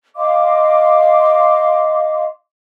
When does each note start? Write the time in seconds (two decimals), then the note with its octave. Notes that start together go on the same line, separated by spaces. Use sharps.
0.16 D#5 F5 C6 D6